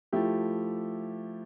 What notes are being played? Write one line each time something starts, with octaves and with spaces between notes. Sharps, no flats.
F3 A3 E4 G4